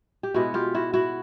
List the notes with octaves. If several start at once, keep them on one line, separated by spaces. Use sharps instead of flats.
G4
B2 G#3 B3 E4 F#4
F4 G4
E4 F#4
E4 F#4